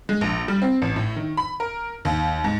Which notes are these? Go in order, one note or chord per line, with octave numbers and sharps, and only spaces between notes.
G#3
A#1
G3
C4
A1
A2
D#3
B5
A#4
D#2
G#2